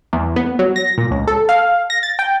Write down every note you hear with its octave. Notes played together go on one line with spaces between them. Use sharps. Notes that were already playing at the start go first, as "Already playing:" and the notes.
E2
B3
F#3
A#6
A#2
C#2
A4
F5
A#6
A6
G5